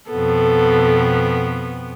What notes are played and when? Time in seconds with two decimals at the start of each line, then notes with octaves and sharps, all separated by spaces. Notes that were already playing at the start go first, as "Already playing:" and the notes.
0.11 F2 B2 B3 A4